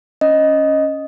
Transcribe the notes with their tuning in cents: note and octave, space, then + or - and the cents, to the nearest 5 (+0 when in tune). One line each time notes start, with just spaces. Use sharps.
C#4 +0 D#5 +0